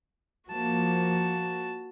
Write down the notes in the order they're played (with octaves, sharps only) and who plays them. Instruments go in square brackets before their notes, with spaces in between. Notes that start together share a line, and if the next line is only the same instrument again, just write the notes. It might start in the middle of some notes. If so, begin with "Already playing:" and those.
[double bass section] F3 A#3 [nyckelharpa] F#4 A5